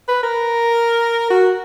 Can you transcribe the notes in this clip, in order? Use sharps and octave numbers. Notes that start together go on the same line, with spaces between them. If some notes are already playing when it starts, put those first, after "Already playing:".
B4
A#4
F#4